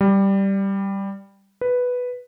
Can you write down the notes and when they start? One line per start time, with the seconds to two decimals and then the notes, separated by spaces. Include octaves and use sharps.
0.01 G3
1.61 B4